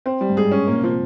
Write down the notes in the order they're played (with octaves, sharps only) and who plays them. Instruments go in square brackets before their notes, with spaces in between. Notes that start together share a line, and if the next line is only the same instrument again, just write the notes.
[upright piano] C4
G3
[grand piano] G2
[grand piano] G#2 [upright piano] G#4
[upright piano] C#4
[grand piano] A#2 [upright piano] A#3
[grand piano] C3
[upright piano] F3
[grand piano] C3